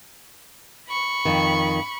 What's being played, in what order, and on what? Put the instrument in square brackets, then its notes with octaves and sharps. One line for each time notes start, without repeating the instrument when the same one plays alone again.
[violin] B5 C#6
[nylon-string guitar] F2 D#3